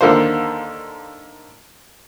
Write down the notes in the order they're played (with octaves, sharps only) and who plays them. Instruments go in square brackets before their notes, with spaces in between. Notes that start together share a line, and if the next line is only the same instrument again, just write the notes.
[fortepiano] D#2 D3 A#3 C5